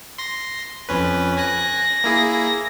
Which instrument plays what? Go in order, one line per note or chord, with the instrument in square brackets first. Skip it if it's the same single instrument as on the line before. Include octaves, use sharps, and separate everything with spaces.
[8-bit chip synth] C6 A#6
F2 C#4 B4
[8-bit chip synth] G#5 F#6 [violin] A#6
[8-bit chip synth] A#3 E4 G#4